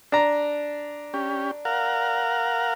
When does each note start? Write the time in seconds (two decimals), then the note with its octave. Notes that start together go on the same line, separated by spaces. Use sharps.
0.12 D4 A#5
1.14 C#4 G4
1.65 A#4 F5 F#5